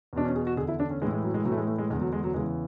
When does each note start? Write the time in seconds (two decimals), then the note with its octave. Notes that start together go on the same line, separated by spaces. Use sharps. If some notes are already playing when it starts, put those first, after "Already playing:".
0.13 E2 B2 D4
0.25 C#4
0.36 G#4
0.47 F#4
0.57 E2 D3 G#4
0.68 E4
0.80 D4
0.90 C#4
1.02 A2 E3 G#3
1.13 G#3
1.24 F#3
1.34 G#3
1.45 A2 F#3
1.49 E3 A3
1.58 G#3
1.68 A3
1.78 G#3
1.90 E2 D3 G#3
2.01 F#3
2.13 G#3
2.24 F#3
2.34 E2 C#3 E3 G#3